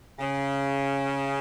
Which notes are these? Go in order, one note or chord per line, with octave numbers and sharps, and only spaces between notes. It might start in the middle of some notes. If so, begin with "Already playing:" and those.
C#3